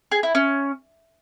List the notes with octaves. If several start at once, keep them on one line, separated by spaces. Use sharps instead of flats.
G#4
E4
C#4